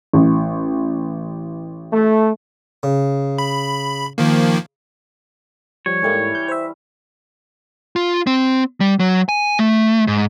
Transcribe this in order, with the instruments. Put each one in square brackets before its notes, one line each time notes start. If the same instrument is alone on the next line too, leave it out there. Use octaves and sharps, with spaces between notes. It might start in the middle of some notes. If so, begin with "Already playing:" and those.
[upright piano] A1
[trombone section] A3
[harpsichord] C#3
[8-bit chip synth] B5
D#3 F3 A#3
[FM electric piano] F3 G3 [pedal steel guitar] C#5
[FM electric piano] G#2 A3 A#3 [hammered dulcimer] E3 G3 C#6
[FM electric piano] G6
C5 E5
[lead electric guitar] F4
C4
G3
F#3
G#5
A3
G#2